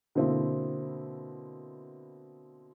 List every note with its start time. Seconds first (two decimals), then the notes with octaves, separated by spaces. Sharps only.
0.15 B2 D3 A#3 C4 E4